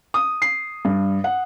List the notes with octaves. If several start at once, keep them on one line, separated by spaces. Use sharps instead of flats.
D#6
C7
G2
F#5